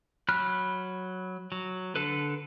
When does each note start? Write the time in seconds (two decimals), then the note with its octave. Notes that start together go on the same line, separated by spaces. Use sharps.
0.29 F#3 B5 F6 F#6
1.52 F#3
1.96 D3 A4 B4